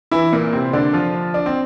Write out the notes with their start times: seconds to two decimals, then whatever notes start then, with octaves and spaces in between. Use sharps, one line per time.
0.12 E3 E4
0.33 A#2 A#3
0.53 C3 C4
0.73 D3 D4
0.93 F3 F4
1.34 D4
1.46 C4